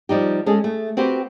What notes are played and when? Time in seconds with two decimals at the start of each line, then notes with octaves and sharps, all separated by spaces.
0.09 F3 G3 D#4 G4
0.46 G#3 C#4 G#4 A4
0.64 A3
0.97 C4 F#4 G4 B4 C5